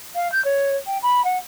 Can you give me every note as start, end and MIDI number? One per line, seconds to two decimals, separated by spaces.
0.15 0.30 77
0.32 0.43 91
0.44 0.76 73
0.86 0.98 79
1.02 1.23 83
1.24 1.37 78